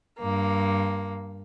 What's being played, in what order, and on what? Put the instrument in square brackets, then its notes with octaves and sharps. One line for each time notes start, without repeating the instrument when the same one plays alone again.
[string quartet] G2 A#3